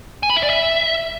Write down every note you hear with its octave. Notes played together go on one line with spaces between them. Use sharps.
G#5
B5
E5
D5
E5